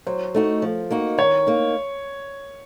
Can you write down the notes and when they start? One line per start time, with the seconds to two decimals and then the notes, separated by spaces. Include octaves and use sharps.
0.07 F#3 C5
0.35 A3 D#4 F#4
0.62 F3
0.91 A#3 D#4 F#4
1.18 D#3 C#5
1.47 A#3 D#4